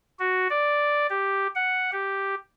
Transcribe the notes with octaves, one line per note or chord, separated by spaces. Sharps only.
F#4
D5
G4
F#5
G4